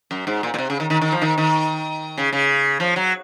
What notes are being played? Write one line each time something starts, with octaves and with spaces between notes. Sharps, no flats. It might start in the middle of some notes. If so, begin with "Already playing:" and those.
F#2
G#2
A#2
A#2
C3
C#3
D#3
D#3
D#3
F3
D#3
D#3
C#3
C#3
F3
F#3